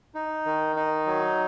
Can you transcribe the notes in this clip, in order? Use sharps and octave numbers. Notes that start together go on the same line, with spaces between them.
D#4
D#3
D#4
F#3